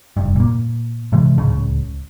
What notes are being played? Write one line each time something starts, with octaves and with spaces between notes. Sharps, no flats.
F1 G2
A#2 A#3
G#2 C3 E3 G#3
D1 C#2 C#3